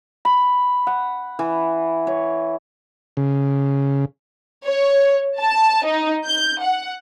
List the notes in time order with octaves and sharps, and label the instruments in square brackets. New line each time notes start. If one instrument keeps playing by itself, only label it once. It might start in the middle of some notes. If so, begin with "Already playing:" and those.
[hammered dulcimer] B5
F#5
E3
C#5
[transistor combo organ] C#3
[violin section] C#5
A5
D#4
G6
F#5